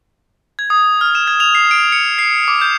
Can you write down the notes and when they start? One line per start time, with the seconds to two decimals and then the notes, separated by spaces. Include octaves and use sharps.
0.59 G#6
0.70 D#6
1.01 F6
1.15 E7
1.28 G#6
1.40 F7
1.55 C7
1.71 D7
1.92 C#7
2.18 C7
2.48 D6
2.61 G6